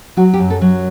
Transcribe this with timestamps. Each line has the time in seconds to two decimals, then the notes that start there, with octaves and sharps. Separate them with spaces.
0.17 F#3 F#4
0.33 G4
0.39 F#2
0.50 A4
0.61 F#3